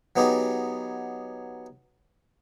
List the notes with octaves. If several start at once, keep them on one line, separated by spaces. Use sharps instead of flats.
F#3 B3 D#4 G4 G#4